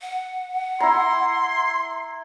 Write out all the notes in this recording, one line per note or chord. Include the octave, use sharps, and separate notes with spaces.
F#5
E4 A#5 C6